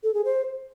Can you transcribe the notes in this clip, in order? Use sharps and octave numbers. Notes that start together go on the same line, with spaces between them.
A4
G#4
C5